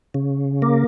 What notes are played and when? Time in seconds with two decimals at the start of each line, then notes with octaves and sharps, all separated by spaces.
0.14 C#3
0.62 A#3